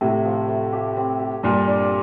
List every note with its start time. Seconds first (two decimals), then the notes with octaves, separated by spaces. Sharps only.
0.01 A2 C3 A3
0.25 F3
0.48 A3
0.73 G4
0.96 C4
1.20 G4
1.43 G2 A#2 G3
1.67 D4